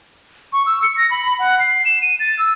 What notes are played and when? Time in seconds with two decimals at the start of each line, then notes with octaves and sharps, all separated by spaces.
0.53 C#6
0.66 E6
0.83 C#7
0.97 A#6
1.11 B5
1.26 B5
1.39 F#5
1.60 C7
1.85 E7
2.02 D#7
2.20 A6
2.39 E6